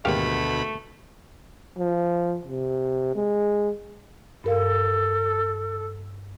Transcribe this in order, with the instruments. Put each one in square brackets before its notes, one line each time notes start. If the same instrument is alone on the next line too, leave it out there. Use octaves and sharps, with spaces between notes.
[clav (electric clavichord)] G#1 G4 F5 [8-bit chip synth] D2 B2 B5 [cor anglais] A3
[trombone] F3
C3
G#3
[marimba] G2 A#4 F5 [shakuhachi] A4